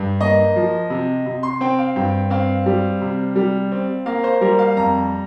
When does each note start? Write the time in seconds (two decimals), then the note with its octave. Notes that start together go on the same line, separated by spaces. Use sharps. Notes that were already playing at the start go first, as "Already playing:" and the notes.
Already playing: G2
0.21 A#3 D#5
0.56 F3
0.90 C3
1.26 C3
1.43 C6
1.61 C4 G5
1.79 F5
1.96 G2 G5
2.30 C4 F5
2.66 G3
3.02 C3
3.36 G3
3.72 C4
4.06 A#3 F5
4.24 C5
4.41 G3 A#4
4.59 F5
4.76 F2 A#5